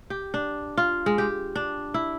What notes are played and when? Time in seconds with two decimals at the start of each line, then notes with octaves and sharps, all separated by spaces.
0.10 G4
0.34 D4
0.78 F4
1.06 G#3
1.18 G4
1.56 D4
1.94 E4